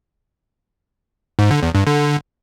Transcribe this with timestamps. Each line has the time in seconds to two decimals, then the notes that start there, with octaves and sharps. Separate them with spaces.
1.39 G#2
1.51 D3
1.63 E2
1.75 G2
1.87 D3